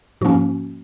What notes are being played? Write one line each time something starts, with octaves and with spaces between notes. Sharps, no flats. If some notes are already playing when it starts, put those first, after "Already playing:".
G#2 F3 A#3 C#4 F#4